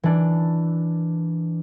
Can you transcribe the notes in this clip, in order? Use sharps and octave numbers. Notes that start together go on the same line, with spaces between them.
E3 D4